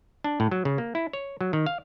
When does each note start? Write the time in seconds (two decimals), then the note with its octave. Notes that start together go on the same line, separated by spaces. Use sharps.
0.24 D4
0.40 A2
0.51 F#3
0.65 C#3
0.78 A#3
0.95 E4
1.13 C#5
1.41 F#3
1.53 D#3
1.66 F5